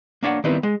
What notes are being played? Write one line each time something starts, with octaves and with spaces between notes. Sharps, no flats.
A#3 D4 C#5 E5 F#5
D#3 G3 B3 C4 E4 B4
G#3